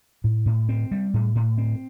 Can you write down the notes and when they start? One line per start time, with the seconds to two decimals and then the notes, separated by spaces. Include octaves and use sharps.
0.24 A2
0.46 A2
0.69 C4
0.91 G3
1.14 A2
1.35 A2
1.58 C4